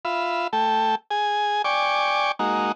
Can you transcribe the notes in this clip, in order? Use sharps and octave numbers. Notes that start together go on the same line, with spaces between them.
F4 E5 B5
A3 A4 G5
G#4 G#5
D5 G5 G#5 C#6 D6
G#3 A#3 D#4 F#4